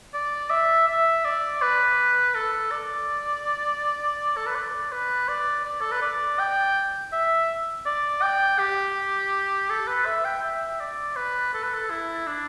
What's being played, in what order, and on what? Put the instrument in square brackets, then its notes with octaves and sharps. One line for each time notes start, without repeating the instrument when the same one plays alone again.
[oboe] D5
E5
E5
D5
B4
A4
D5
A4
B4
D5
B4
D5
D5
A4
B4
D5
G5
E5
D5
G5
G4
A4
B4
E5
G5
E5
D5
B4
A4
B4
A4
E4
D4